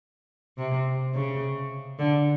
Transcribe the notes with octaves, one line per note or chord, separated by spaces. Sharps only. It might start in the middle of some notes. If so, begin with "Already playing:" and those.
C3
C#3
D3